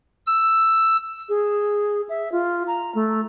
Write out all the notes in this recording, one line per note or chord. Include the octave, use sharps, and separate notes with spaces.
E6
G#4
E5
F4
A#5
A3